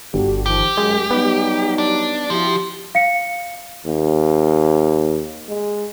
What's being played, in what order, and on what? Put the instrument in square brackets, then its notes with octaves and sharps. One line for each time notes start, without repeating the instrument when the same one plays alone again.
[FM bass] G1 [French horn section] D3 F#4 G4
[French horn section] D#3 F3 [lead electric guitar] G4
[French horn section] F#2 [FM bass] G#3
[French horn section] F#3 G3 D#4 [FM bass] B3
[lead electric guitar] D4
[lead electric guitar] F3 [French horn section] E4 F#4 G4
[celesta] F5 C#7
[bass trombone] D#2
G#3